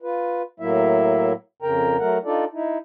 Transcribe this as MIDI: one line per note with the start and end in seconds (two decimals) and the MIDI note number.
0.02 0.42 65
0.02 0.42 71
0.60 1.33 45
0.60 1.33 54
0.60 1.33 58
0.60 1.33 64
0.60 1.33 76
1.62 1.97 41
1.62 1.97 49
1.62 1.97 70
1.62 1.97 79
1.62 1.97 82
1.99 2.18 54
1.99 2.18 57
1.99 2.18 70
1.99 2.18 78
2.25 2.45 62
2.25 2.45 63
2.25 2.45 65
2.25 2.45 69
2.25 2.45 74
2.53 2.78 63
2.53 2.78 64